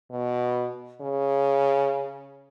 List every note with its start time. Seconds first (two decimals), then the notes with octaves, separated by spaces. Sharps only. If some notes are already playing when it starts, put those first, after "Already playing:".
0.11 B2
1.01 C#3